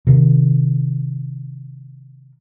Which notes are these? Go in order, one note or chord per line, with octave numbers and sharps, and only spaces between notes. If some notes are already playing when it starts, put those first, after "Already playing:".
C3 D#3